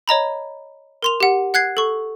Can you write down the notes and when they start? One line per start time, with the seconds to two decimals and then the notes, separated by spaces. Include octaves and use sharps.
0.08 C#5 D#5 A#5 B5
1.02 A#4 C6 F7
1.20 G4 F#5
1.54 F#5 F#6 G#6 C7
1.77 A4 C#6